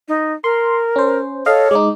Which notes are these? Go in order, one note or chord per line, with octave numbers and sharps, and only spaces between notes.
D#4
A#4 C6
C#4 C5
A4 C#5 D#5 F5
G#3 D#4 D6